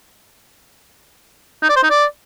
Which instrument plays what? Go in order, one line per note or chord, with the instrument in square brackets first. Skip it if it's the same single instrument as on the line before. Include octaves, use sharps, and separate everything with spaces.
[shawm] D#4
D5
C5
D#4
D5